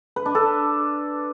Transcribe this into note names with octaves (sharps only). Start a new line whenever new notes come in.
B4
D4
A4